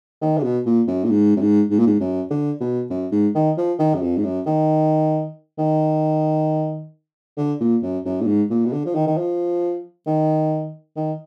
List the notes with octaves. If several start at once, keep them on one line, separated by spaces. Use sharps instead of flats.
D#3
D3
B2
A#2
F#2
A#2
G#2
F#2
G#2
G#2
A#2
G#2
F#2
D3
B2
F#2
G#2
D#3
F3
D#3
F#2
F2
G#2
F#2
D#3
D#3
D3
A#2
F#2
F#2
A#2
G#2
A#2
B2
D3
F3
D#3
D#3
F3
D#3
D#3